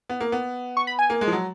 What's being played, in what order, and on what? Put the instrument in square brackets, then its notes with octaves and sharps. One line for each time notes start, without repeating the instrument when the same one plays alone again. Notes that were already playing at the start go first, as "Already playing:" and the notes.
[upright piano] B3
A#3
B3
[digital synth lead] C#6
B5
G#5
[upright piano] A#3
G#3
F3
F#3